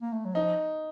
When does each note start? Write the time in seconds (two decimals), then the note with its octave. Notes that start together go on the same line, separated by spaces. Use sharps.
0.02 A#3
0.13 A3
0.25 F#3
0.35 F3 D#4